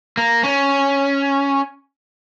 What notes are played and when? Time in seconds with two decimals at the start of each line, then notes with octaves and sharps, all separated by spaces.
0.17 A#3
0.43 C#4